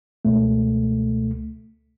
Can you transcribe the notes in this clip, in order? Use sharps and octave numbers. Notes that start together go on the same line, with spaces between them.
C#2 B2 A3